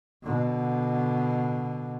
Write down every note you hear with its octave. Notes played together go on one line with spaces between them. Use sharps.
B2 D3